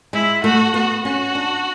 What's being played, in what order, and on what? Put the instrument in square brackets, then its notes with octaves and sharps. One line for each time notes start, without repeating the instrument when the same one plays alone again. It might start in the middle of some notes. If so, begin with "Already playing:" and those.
[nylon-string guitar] G#3 [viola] E4
[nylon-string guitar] A3 [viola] F#4
[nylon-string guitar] B3 [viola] F#4
[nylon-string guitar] C#4 [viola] F#4
[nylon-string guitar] D4